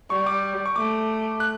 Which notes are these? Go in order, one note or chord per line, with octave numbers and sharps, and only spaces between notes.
G3 C#6
D6
C#6
A3 D6
F#6